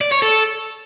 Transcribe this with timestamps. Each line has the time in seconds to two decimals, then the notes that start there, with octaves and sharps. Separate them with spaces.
0.01 D5
0.11 C#5
0.22 A4